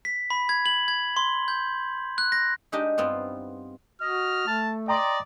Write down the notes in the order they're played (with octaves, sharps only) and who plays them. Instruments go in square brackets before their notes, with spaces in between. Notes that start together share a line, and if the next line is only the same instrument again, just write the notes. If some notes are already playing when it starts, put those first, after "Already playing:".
[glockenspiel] B6
B5
G#6
F#7
G#6
C6
G6
F#6
A#6
[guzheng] G#3 D4 D#4 G4 D#5
G2 B3 C4 F4
[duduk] F#4 [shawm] D#5 [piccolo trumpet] F6
[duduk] A3 [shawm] A5
[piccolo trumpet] D5 [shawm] D#5 [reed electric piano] G5 A#5 C6